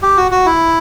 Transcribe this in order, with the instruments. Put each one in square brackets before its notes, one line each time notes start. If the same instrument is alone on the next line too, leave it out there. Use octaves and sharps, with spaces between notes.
[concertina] G4
F#4
F#4
E4